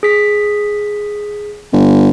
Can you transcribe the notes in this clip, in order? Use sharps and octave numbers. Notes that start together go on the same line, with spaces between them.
G#4 B6
G1